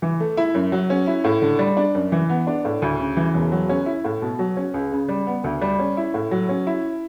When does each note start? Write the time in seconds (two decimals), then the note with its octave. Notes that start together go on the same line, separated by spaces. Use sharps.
0.02 E3
0.20 A3
0.37 E4
0.54 F#2
0.72 F#3
0.90 C#4
1.07 E4
1.24 A2
1.42 D3
1.59 G3
1.77 D4
1.95 F#2
2.12 E3
2.29 B3
2.47 D4
2.65 A2
2.82 D2
2.99 C#3
3.17 E3
3.34 E1
3.52 F#3
3.69 C#4
3.86 E4
4.04 A2
4.22 B2
4.39 F#3
4.57 C#4
4.74 C#2
4.92 C#3
5.08 G3
5.27 B3
5.44 D2
5.61 G3
5.79 C#4
5.97 E4
6.14 A2
6.31 F#3
6.49 C#4
6.67 E4